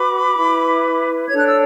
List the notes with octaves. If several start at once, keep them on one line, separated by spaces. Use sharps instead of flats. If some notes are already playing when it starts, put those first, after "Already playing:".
Already playing: F#4 B4 B5 D6
E4 B4
D4 A4 C#5 G#6
F#6
E6